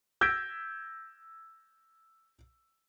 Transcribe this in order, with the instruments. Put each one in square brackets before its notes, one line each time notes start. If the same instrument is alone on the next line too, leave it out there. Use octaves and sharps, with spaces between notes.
[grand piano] E6 G6 G#6 A#6 B6 D7